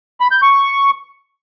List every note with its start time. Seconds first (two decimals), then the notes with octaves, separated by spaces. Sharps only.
0.20 B5
0.31 G6
0.42 C#6